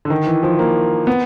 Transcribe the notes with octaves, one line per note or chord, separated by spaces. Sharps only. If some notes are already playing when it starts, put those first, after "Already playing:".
D3
D#3
E3
F3
A#3
B3